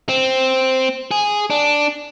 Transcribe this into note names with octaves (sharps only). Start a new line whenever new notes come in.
C4
G#4
D4